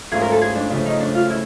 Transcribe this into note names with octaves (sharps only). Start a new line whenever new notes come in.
G#2 E3 A3 C#4 F4 G#4
A#4
A4
G#4
D4
C#3 F3 A3 C#4 D4
D#4
D4
F4
E4